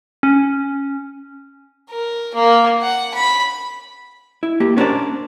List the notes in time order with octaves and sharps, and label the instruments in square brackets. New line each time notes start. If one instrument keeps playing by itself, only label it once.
[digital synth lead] C#4
[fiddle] A#4
A#3
F#5
B5
[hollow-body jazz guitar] E4
A#3 G4
B3 C#4 D4 A#4 C5 D5